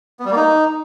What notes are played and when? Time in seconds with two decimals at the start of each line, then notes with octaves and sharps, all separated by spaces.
0.20 B3
0.25 G3
0.30 A#3
0.36 D#4